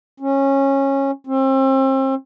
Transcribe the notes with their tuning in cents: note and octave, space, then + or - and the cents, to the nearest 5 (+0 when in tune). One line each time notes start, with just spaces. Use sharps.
C#4 -20
C4 +35